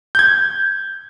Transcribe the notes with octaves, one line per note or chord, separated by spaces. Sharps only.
G6 G#6